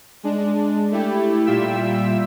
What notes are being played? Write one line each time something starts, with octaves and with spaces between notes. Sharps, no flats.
G#3 D4
A3 E4 G4
A#2 G3 F4 E5 G5 E6